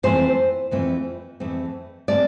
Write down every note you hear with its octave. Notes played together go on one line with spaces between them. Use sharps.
F2 E3 A3 C4 C5
F2 E3 A3 C4
F2 E3 A3 C4
E3 A3 C4 D5